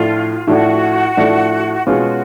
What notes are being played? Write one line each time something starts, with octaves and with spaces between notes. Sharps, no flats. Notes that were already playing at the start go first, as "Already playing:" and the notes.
Already playing: A2 F3 A3 D4 F4
A2 F3 A3 D4 F#4
A2 F3 A3 D4
B2 G#3 C#4 F4 F#4